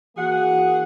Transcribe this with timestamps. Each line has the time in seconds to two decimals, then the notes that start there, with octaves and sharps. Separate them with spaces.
0.17 E3 A#3 F#4 G#4 F#5